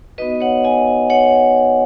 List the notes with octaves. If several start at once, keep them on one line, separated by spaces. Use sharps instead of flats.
B3 D#4 F#4 B4 D#5
C#5 F#5
D#5 G#5
C#5 F#5